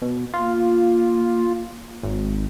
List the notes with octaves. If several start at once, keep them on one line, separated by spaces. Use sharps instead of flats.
B2
A#3 F4
G#1